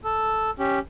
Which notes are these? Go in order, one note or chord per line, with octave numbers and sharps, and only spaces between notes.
A4
C#4 G4